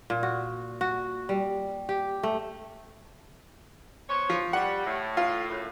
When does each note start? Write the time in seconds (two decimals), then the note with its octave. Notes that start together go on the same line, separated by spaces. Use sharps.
0.10 A#2
0.23 F#4
0.81 F#4
1.29 G3
1.89 G4
2.23 A3
4.09 B3 C5 C#5
4.30 F3
4.53 G3 F#5
4.86 A2
5.17 F4
5.49 F#2 A2